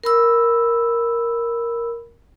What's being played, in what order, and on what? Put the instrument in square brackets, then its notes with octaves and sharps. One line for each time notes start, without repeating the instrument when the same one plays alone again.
[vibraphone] A#4 B5 E6